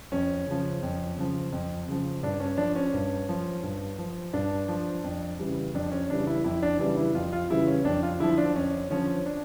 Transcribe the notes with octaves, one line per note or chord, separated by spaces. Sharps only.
F2 C#4
C#3 F3
F2
C#3 F3
F2
C#3 F3
G2 D4
C#4
F3 D4
C#4
G2
F3
G2
F3
G2 D4
F3
F2
C#3 E3 G3
F2 D4
C#4
C#3 E3 G3 D4
E4
F2 E4
D4
C#3 E3 G3 D4
E4
F2 F4
F4
C#3 E3 G3 E4
C#4
F2 D4
F4
D3 F3 E4
D4
F2 C#4
D3 F3 C#4
D4